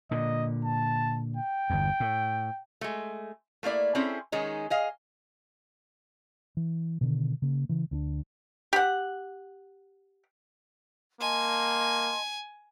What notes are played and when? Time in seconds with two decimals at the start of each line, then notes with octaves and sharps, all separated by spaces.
0.11 A#2 D3 D#5
0.65 A5
1.37 G5
1.70 G1 E2
2.00 A2
2.81 G#3 A3
3.63 A3 A#3 E4 D5
3.95 C4 C#4 E4 G#4 A4 C5
4.32 D#3 G#3 C#4 D#4
4.70 G#4 D#5 F5
6.57 E3
7.01 B2 D3 D#3
7.42 C#3 A#3
7.69 C#3 E3
7.91 D2 C#4 D4
8.73 G4 F#5
11.21 A#3 D#5 G#5 A5 C6